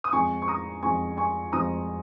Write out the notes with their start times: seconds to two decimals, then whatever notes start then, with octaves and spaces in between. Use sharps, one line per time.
0.04 D#6
0.12 F2 F3 G#3 G#5 C#6
0.42 C#6
0.48 A#5 D#6
0.83 F2 F3 G#3 G#5 C#6
1.17 G#5 C#6
1.52 F2 F3 G#3 A#5 D#6